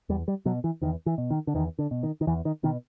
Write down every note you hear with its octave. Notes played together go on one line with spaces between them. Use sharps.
E2 G3
G3
B2 F#3
E3
E2 D#3
E3
B2
D#3
D3
E2 D#3
D3
B2
D#3
D#3
E2 E3
D#3
B2 D#3